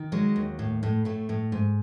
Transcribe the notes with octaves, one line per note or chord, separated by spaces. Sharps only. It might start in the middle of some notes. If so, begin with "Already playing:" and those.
Already playing: D#3
F#3 G#3
D#2
A2
A2
A2 A3
A2
G#2